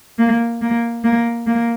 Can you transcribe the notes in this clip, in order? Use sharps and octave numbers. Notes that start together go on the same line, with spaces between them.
A#3
A#3
A#3
A#3